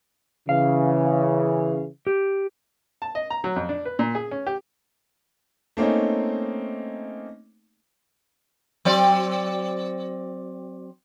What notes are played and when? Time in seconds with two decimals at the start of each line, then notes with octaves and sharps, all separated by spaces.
0.49 C#3 E3 F5
2.07 G4
3.02 A5
3.15 D#5
3.30 A#5
3.44 F#3
3.56 F2
3.69 D4
3.85 B4
3.99 A#2
4.15 G#4
4.31 C#4
4.47 G4
5.77 A3 A#3 C4 C#4 D#4
8.85 F#3 C4 D5